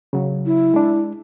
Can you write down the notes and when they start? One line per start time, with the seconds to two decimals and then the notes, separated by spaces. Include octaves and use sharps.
0.13 C#3 F#3
0.46 E4
0.74 G#3 D4